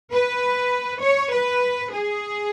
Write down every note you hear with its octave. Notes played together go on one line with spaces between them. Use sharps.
B4
C#5
B4
G#4